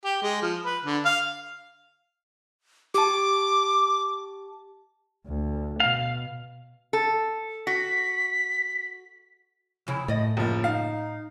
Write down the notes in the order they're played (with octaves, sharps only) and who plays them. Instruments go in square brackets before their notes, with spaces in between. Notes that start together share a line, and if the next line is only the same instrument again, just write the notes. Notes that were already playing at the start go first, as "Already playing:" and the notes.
[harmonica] G4
G#3
F3
B4
D3
F5
[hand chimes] G4 A5 [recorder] D6
[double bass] D2
[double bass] B2 [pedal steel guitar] F5
[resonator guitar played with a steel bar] A4
[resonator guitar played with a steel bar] F#4 [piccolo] B6
[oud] F2 C#3 E4
[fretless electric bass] A2 [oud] D5 D#5
[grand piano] F#1 F3 [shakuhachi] A#3
[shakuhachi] D#4 [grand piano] F5